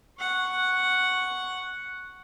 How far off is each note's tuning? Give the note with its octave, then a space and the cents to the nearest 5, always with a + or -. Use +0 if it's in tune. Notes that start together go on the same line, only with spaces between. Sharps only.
F#5 +0 C#6 +0